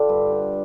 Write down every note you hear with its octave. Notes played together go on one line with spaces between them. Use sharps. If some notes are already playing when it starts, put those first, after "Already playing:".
Already playing: D3 D4 F4 G4
G2
D3